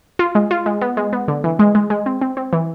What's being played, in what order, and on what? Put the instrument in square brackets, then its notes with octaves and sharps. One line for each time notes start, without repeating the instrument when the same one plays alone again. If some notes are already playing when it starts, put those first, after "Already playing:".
[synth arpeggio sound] F4
G#3
F4
G#3
B3
G#3
B3
D3
E3
G#3
G#3
G#3
C4
C4
C4
E3